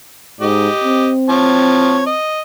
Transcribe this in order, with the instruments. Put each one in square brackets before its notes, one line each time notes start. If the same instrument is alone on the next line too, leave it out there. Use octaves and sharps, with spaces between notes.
[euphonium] G#2 [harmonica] G4 D#5
[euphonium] C4
[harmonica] F3 C#5 A5
D#5